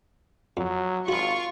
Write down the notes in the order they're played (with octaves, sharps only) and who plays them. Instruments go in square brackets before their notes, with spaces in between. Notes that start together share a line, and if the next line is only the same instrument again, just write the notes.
[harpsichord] F2 [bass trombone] F#3
[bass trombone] G#1 [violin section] F4 C#6 [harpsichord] F#4 B5